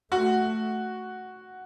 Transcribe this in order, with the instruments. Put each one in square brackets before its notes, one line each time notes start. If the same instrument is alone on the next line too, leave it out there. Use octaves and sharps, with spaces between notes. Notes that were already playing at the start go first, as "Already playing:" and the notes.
[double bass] A3 [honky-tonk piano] F#4